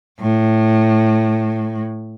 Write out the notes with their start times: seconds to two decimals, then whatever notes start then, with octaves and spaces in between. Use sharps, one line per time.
0.20 A2